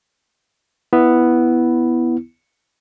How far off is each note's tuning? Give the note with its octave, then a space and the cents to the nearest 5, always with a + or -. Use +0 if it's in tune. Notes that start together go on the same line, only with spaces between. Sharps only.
B3 +0 E4 +0